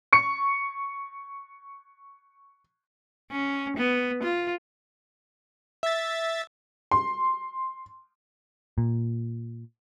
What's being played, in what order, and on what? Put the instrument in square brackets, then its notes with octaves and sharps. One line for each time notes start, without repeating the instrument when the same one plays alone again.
[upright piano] C#6 C#7
[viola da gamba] C#4
B3
F4
[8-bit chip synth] E5 A6
[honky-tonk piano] C6
[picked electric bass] A#2